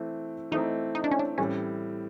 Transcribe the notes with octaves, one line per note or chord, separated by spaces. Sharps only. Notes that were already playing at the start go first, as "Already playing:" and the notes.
Already playing: E3 A3 C4
E3 A3 C4 D#4
D#4
D4
C#4
D4
A2 E3 G3 C4 C#4